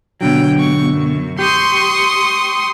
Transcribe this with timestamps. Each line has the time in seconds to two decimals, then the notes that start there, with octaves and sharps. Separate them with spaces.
0.21 B2 D3 F#3 G5
0.59 G#2 C#6
0.88 F#2
1.39 G4 C6 C#6 D#6